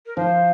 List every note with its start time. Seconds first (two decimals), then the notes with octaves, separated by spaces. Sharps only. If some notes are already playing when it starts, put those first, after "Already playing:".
0.06 A#4
0.17 F3 C5